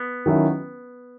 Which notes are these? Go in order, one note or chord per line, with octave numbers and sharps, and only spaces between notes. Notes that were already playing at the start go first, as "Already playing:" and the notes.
Already playing: B3
D#3 F#3 C#4 E4